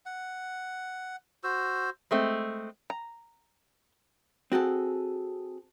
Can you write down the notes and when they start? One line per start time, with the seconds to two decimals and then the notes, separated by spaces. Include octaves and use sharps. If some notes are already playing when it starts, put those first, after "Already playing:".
0.06 F#5
1.44 F#4 C5 E6
2.11 G#3 A3 C4
2.90 A#5
4.52 C4 F#4 G#4 A4